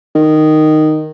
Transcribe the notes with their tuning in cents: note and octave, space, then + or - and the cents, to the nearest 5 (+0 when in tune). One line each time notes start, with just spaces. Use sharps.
D#3 -10